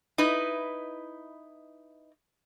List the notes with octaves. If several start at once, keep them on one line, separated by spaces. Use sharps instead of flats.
D#4 E4 B4 D#5